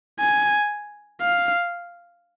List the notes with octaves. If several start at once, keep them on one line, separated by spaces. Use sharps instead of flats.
G#5
F5